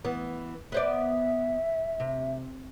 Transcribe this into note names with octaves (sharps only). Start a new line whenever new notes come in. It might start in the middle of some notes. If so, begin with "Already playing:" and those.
E3 B3
B3 C5 D5 E5
C3